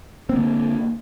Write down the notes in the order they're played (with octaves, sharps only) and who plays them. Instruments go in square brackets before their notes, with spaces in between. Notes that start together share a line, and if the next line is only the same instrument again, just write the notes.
[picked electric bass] C4
A#3
D3